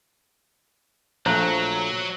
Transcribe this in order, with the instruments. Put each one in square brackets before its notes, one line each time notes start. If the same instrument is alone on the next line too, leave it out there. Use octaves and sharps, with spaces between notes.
[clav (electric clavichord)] A#1 F3 A3 [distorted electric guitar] F#3 [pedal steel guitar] C5 A#5 F#6